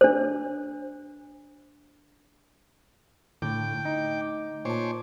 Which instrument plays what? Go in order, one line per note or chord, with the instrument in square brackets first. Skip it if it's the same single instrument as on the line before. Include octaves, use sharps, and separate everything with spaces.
[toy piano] D4 C5
[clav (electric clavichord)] A2 [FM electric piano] D3 A3 [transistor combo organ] G5 D6
[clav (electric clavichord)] D#4
[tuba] A#2 [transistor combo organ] C5 C#5 D6 [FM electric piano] G#5 A5